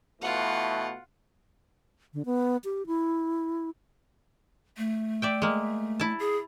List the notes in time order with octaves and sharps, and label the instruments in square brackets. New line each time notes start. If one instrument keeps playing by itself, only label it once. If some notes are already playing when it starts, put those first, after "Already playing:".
[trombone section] B2 E3 A3 [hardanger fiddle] F4 F#5
[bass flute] D3
B3
G4
E4
[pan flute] A3
[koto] D5 E5 G5
G#3 A#3
E4 A5
[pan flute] G#4